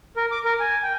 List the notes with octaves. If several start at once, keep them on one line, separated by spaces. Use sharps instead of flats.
A#4
D6
A#4
G#5
G5